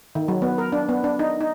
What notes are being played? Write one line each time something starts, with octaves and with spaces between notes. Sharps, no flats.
D#3
F#3
B3
A#4
D4
B3
D4
D#4
D#4